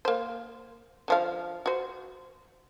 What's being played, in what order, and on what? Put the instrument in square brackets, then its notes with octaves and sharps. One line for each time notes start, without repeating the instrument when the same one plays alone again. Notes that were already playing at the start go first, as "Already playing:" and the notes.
[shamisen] A#3 C5
D3 F3 F5
F#4 C5